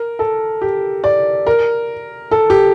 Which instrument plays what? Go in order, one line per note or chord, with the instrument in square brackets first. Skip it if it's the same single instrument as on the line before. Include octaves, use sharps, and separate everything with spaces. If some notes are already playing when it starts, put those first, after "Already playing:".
Already playing: [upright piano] A#4
A4
G4
D5
A#4
A4
G4